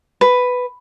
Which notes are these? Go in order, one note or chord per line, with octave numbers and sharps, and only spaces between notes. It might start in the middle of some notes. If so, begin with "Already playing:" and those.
B4